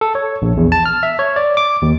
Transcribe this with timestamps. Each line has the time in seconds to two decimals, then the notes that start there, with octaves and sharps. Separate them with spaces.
0.01 A4
0.15 C#5
0.42 A#1
0.57 E2
0.72 A5
0.86 F6
1.03 E5
1.19 C#5
1.36 D5
1.57 D6
1.82 D#2